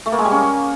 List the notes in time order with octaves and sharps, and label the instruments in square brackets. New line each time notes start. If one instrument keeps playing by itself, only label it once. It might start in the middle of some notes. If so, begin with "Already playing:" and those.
[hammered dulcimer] A3
A#3
G#3
G3
C#4